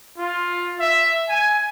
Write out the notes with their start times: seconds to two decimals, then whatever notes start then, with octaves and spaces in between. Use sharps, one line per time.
0.18 F4
0.80 E5
1.29 G#5